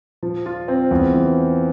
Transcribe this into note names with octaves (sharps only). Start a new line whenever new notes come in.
F3
F4
C4
E2
E3